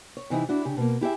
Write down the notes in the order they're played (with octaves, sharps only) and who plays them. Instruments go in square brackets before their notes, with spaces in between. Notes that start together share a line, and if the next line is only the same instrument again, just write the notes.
[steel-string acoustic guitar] C#5
C3 E3 D#4 E4
D4 E4 F#4
C#3 G4
B2 A#3
E4 G4 G#4 E5